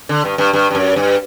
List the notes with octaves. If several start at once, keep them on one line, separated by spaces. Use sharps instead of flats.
D3
G2
G2
G2
G2
F#2
G2